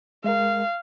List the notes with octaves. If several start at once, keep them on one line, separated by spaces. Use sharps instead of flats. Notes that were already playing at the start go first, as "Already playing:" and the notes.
G#3 A#4 F5